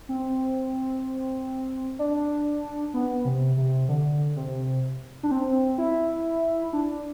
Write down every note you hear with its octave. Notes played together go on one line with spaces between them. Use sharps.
C4
D4
B3
C3
C3
D3
C3
D4
C4
E4
D4